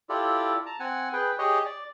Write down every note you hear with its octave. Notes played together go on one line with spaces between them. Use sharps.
E4 F4 G4 A4 D5
A5 A#5
C4 F#5 G#5
G#4 B4 G5
G4 G#4 C#5 D#5
D5